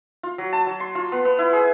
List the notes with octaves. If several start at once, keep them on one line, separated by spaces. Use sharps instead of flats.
F4
F#3
A5
F#3
C6
F4
B3
B3
E4
G#4